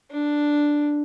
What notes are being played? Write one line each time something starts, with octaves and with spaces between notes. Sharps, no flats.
D4